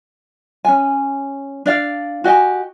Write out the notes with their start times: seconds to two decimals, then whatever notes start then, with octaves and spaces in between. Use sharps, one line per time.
0.65 C#4 G#5
1.66 D4 D5 F5
2.24 F#4 G4 D#5 G#5